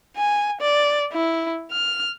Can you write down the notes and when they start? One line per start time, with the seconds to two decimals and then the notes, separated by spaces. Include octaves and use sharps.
0.17 G#5
0.61 D5
1.13 E4
1.72 F6